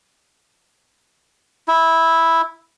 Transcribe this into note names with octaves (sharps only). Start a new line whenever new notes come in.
E4